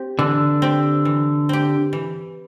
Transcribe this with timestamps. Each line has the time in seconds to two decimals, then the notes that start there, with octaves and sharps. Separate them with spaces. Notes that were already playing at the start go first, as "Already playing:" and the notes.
Already playing: C4 G4
0.19 D3 E3
0.62 C4 G4
1.05 E3
1.49 C4 G4
1.93 E3